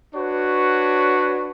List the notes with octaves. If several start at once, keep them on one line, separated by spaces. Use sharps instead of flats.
D4 F#4 B4 C#5